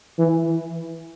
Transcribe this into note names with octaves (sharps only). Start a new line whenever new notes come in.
E3